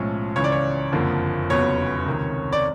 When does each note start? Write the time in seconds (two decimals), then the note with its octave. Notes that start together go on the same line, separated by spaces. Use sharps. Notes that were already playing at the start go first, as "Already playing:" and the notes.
Already playing: B1 A2 F3 G#3 C#4
0.36 C#2 C#3 E3 C#5
0.44 D5
0.52 C#5
0.92 F#1 F2 D3 F3 A#3
1.50 F1 E2 C#3 F#3 B3 C#5
2.06 C#2 C3 D#3
2.53 D5